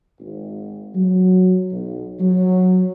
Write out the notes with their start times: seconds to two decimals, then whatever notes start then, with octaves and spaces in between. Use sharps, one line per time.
0.20 G#1
0.95 F#3
1.72 B1
2.21 F#3